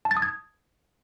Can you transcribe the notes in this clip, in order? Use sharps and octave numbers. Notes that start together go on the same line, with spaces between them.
A5
A6
D#6
G#6